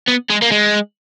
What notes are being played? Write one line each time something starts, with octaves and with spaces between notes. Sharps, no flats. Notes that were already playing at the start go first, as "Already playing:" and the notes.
B3
G#3
A#3
G#3